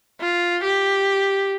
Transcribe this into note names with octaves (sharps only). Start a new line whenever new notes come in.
F4
G4